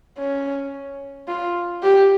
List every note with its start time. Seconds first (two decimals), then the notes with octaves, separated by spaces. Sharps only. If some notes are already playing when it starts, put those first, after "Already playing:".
0.18 C#4
1.28 F4
1.83 G4